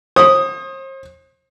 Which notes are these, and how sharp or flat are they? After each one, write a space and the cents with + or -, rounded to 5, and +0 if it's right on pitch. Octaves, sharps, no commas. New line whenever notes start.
C5 +40 D#6 +0